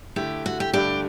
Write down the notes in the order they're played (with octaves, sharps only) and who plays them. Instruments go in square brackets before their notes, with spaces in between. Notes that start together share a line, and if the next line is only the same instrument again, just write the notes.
[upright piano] D3 A3 E4 [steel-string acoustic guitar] G4
[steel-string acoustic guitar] F#4
G4
[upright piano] G2 D3 A3 D4 [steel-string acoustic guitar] G4